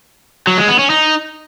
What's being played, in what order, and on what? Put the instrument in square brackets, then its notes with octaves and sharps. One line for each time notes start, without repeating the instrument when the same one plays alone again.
[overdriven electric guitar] F#3
G#3
B3
C#4
D#4